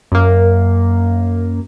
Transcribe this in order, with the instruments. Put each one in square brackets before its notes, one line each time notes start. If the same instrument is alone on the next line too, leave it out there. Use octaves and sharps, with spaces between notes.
[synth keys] F#2 A#3